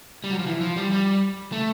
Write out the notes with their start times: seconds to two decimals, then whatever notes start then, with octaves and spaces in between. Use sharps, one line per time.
0.24 G3
0.31 F#3
0.39 F3
0.46 E3
0.61 F3
0.76 G3
0.91 G3
1.52 A3